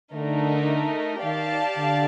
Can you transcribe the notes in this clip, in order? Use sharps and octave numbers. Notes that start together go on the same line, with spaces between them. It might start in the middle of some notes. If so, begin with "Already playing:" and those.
D3 A3 D#4 A#4
D#3 G4 D5 F5 A5
D3